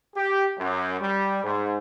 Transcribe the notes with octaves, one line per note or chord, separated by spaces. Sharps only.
G4
F#2
G3
G#2